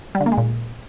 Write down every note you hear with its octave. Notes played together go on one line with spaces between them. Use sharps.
G3
D3
A#3
G#3
A#2